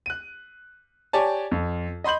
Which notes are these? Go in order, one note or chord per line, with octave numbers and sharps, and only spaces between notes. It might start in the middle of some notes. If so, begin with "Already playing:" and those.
F#6 D#7
G4 C#5 D5 G#5 A5
F2
D#5 B5 C6 G6 F#7